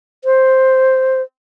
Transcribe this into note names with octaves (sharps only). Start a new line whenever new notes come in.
C5